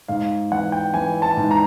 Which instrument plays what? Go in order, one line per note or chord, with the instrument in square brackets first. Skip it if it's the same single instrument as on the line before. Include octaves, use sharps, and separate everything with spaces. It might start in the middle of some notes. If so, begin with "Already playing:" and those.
[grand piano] G#2 F5
E3 F#5
G5
E3 G#5
A5
G#2
A#5